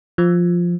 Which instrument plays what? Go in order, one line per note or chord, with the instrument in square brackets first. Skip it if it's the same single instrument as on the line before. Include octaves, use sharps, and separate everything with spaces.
[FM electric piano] F3